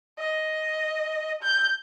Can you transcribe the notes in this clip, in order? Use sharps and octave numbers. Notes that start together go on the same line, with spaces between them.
D#5
G6